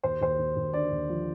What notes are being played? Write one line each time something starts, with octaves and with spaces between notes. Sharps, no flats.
D#2 C5
D#2 C5
D#2
D#2
D3 D5
D#2
F3